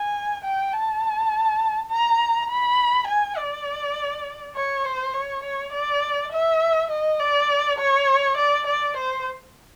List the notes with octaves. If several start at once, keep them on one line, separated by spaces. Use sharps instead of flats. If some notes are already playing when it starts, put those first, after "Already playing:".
Already playing: G#5
G5
A5
A#5
B5
G#5
D5
C#5
C5
C#5
C#5
D5
E5
D#5
D5
C#5
D5
D5
C5